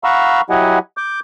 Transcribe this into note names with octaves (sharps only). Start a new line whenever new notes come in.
F5 F#5 A#5 B5 C#6 E6
F#3 E4 G4 D#5 F#5 G#5
D6 G6